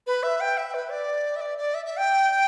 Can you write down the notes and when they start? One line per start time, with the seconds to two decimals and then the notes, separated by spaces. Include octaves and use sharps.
0.07 B4
0.23 E5
0.41 G5
0.58 E5
0.74 B4
0.91 D5
1.36 E5
1.41 D5
1.58 D5
1.74 E5
1.86 E5
1.97 G5